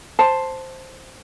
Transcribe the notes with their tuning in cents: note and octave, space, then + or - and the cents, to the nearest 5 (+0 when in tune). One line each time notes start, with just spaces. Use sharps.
C5 +0 A5 +0